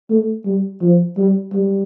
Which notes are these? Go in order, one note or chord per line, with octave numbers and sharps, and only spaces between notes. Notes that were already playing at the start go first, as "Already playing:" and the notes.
A3
G3
F3
G3
G3